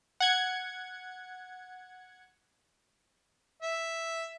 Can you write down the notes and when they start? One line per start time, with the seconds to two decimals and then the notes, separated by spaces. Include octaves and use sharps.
0.20 F#5 G#6 C#7
3.62 E5